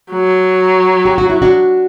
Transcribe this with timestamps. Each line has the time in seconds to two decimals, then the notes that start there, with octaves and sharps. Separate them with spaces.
0.11 F#3
1.05 G4
1.18 F#4
1.30 E4
1.42 D4 F#4